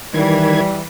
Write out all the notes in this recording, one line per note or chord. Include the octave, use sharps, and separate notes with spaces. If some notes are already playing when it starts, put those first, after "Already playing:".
D#3 E3 G3 G#6